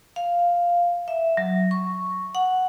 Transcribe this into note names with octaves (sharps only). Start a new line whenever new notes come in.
F5
E5
F#3
C#6
F#5